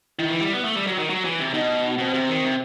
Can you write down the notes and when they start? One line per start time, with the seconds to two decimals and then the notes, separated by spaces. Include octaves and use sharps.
0.19 D#3 E4
0.31 E3
0.41 G3
0.53 B3
0.64 A3
0.75 G3
0.87 F#3
0.98 D#3
1.10 F#3
1.25 E3
1.39 C3
1.54 B2 D#4
1.98 B2 C4
2.14 C3
2.29 D#3
2.44 C3